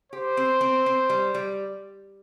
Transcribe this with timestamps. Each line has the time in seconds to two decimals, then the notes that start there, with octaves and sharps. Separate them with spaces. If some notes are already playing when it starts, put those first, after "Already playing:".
0.12 G4 C5
0.37 C4
0.61 C4
0.86 C4
1.09 G3
1.34 G3